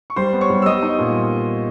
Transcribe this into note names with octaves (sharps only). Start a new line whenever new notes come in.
C#6
G3 C5 C6
B3
C#5 C#6
G3
E6
G3 D#5 D#6
D#4
A#2